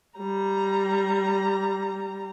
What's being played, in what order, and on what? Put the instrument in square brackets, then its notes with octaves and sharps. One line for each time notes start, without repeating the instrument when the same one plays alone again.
[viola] G3 A#5